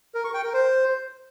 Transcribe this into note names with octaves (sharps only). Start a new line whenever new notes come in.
A#4
C#6
G5
A#4
C5